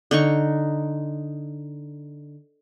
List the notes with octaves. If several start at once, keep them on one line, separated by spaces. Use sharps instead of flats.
D3 D#4 C#6